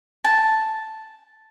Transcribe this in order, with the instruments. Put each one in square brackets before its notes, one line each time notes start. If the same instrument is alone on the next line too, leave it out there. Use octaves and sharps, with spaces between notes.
[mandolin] A5